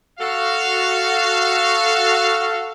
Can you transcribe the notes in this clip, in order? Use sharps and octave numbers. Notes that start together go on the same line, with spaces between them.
F#4 A4 F5